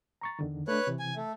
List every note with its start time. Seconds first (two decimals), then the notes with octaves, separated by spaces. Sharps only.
0.21 A#5 C#6 A6
0.39 E2 D3 D#3
0.68 A3 D4 B4 C#5 F#6
0.87 C3 E3
1.00 G#5
1.16 A3